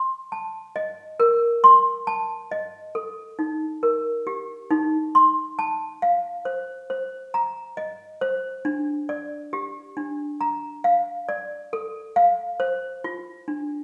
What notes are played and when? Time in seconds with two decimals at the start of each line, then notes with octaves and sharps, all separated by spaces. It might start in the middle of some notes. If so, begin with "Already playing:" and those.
Already playing: C6
0.32 A5
0.76 D#5
1.20 A#4
1.64 C6
2.07 A5
2.51 D#5
2.95 A4
3.39 D#4
3.83 A#4
4.27 G4
4.71 D#4
5.15 C6
5.59 A5
6.02 F5
6.45 C5
6.90 C5
7.34 A#5
7.77 D#5
8.21 C5
8.65 D4
9.09 D5
9.53 G4
9.97 D4
10.41 A#5
10.84 F5
11.29 D5
11.73 A4
12.16 F5
12.60 C5
13.04 F4
13.48 D4